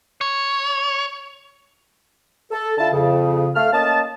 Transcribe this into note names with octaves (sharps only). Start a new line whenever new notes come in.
C#5
A4
D3 E4 F4 A4 A5
F2 C#3
A3 F5 F6
A#3 C#4 D#5 A5